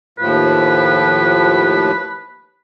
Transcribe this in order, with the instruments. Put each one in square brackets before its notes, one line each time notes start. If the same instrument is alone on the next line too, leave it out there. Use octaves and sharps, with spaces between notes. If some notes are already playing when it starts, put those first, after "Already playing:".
[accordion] D#2 A2 F3 [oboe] B4